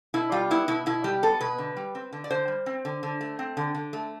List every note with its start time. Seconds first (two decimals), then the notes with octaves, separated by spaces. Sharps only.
0.14 B2 E4
0.32 G3 F4
0.51 B3 E4
0.68 B2 E4
0.86 B2 E4
1.04 G3 G4
1.23 B3 A4
1.41 B2 B4
1.58 D3
1.77 G3
1.95 C4
2.13 D3
2.24 D5
2.31 D3 C5
2.48 G3
2.66 C4
2.85 D3
3.03 D3
3.21 A3
3.39 C4
3.57 D3
3.75 D3
3.93 A3